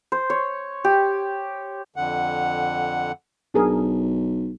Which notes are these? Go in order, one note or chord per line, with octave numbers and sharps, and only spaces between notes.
C5
C#5
G4
F2 D3 F#5
B1 D4 G#4 A#4